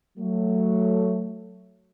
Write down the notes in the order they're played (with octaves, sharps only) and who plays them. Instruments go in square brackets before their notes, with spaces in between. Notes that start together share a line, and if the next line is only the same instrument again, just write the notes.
[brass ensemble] F#3 A3